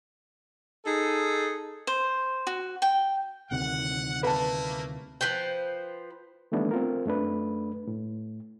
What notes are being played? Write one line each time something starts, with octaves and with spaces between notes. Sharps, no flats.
D#4 G#4 A4
C5
F#4
G5
D2 C3 D#3 F#5
A3 A#3 B4 A5
F3 B4 C5 G5
D#3 E3 G3 A3 B3 D4
C4 F4 A#4
F#2 A3 D4 B4
A2